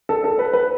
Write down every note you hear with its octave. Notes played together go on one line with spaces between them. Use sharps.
A4
A4
B4
B4